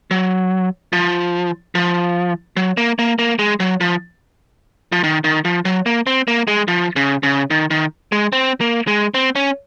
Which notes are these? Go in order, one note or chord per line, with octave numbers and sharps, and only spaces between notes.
F#3
F3
F3
F#3
A#3
A#3
A#3
G#3
F#3
F3
F3
D#3
D#3
F3
F#3
A#3
C4
A#3
G#3
F3
C#3
C#3
D#3
D#3
G#3
C4
A#3
G#3
C4
C#4